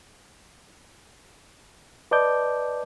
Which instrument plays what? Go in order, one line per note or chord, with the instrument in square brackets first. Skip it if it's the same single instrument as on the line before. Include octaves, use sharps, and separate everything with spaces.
[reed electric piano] B4 D5 D#5 A5 D6 G6